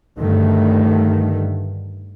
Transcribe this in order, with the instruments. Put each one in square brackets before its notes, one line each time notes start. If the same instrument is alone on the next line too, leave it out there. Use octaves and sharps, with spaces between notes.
[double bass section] G2 D3 D#3 A3